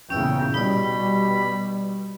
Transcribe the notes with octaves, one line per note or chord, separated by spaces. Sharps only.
E2 A#2 C#3 C#4 G5 E6
B2 G3 D#4 D5 B5